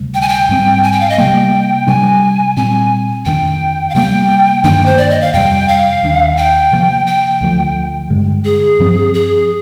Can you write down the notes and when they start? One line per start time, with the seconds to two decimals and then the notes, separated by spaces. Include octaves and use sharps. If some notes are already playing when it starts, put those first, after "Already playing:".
Already playing: D2 C3 G3
0.14 G5
0.22 G#5
0.29 G5
0.49 G#2 G3 C4
0.83 G#5
0.92 G5
1.01 F5
1.10 D#5
1.18 C3 G3 A#3 G5
1.87 C3 G3 D4 G#5
2.57 A#2 G3 C4 G#5
3.25 F2 D#3 A#3 D4 G5
3.90 F5
3.94 C3 G3 A#3 G5
4.64 G2 D#3 A#3 D4 G5
4.86 C5
4.98 D5
5.10 D#5
5.21 F5
5.33 F2 C3 G3 G5
5.68 F5
6.03 D#2 D#3 A#3 D4
6.37 G5
6.72 C3 F3 A#3
7.07 G5
7.41 D2 D3 F3
8.10 G2 D3 G#3
8.45 G#4
8.79 G2 F3 C4
9.14 G#4